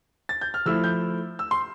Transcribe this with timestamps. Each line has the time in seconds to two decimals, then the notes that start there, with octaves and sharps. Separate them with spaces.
0.29 A6
0.41 G6
0.54 F6
0.66 F3 A3 E4 E6
0.84 G6
1.39 E6
1.51 C6